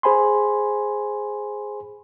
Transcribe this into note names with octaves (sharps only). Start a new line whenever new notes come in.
G#4 C5 G#5 B5 C6